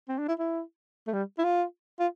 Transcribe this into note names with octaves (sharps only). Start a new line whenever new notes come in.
C4
D4
E4
E4
A3
G3
E4
F4
F4